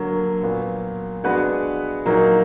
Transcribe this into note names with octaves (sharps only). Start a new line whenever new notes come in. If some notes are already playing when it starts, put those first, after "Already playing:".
Already playing: D3 F#3 A#3
A#2 F#3 B3
G#3 B3 D4 F#4 B4
A#2 F#3 A#3 D#4